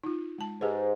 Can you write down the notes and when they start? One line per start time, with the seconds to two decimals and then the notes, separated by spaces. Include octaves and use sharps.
0.03 D#4 F4
0.38 G#3 A5
0.61 G#2 G4 G#4 B4